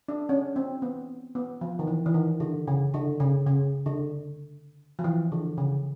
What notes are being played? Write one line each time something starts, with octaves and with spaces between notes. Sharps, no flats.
D4
C#4
C4
B3
B3
F3
D#3
E3
E3
D#3
D3
C#3
D3
C#3
C#3
D3
F3
E3
D3
C#3